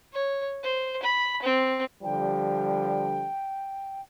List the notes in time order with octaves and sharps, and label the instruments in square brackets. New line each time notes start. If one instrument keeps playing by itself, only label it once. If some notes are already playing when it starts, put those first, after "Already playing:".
[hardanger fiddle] C#5
C5
B5
C4
[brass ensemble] D3 F3 G3 [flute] G5